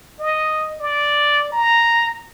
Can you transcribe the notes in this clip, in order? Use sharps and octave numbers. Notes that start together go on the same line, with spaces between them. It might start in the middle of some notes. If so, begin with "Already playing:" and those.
D#5
D5
A#5